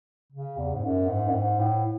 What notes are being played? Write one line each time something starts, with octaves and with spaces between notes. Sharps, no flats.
C#3
E2
G#2
F#2
G#2
F#2
G#2
A2